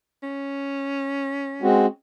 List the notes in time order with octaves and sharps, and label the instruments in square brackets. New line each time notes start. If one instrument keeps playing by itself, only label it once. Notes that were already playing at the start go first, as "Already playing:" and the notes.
[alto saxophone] C#4
[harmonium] G#3 C4 F#4